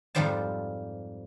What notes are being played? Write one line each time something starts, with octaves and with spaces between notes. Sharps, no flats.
F2 G#2 F3 G3 C5 A5